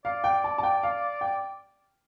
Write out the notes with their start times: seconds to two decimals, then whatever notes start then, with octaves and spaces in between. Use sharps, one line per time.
0.05 D5 F5
0.24 G5
0.44 A5
0.58 A5
0.63 G5
0.83 F5
1.21 G5